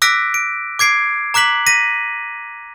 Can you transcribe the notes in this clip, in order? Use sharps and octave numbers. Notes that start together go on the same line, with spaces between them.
D6 E6 F#6 A#6 B6 D7
D7
D6 G#6 C7 D7
A#5 D6 F#6 B6 F#7
A#6 B6 D#7